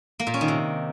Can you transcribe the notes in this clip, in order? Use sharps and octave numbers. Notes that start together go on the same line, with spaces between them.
A#3
A#2
C#4
D#3
C3